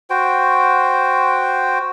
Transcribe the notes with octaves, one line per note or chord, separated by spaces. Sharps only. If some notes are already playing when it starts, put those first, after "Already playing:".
F#4 C5 G5